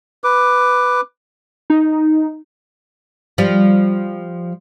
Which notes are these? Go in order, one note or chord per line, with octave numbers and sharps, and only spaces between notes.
B4 D6
D#4
F3 G3